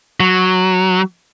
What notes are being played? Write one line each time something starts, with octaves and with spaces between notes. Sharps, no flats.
F#3